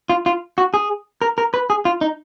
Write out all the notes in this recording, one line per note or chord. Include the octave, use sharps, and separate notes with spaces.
F4
F4
F#4
G#4
A#4
A#4
B4
G#4
F4
D#4